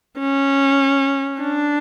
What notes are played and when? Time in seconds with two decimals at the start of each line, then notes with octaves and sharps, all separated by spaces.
0.20 C#4
1.41 D4